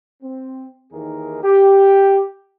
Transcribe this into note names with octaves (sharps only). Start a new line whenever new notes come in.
C4
D#2 D#3 E3 D#4 G#4 A#4
G4